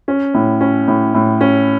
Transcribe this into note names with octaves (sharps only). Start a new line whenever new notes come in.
C#4
A2
C#4
A2
A2
C#4